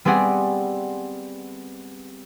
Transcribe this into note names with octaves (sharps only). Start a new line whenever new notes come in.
G3 B3 C4 G#4 D5 F#5